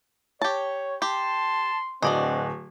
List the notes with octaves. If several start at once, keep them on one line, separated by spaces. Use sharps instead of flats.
G4 C#5 A5
G4 A5 C6
D1 C4 D4 F#4 D5 D#5